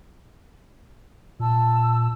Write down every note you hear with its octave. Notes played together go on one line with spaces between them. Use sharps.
A#2 A5 E6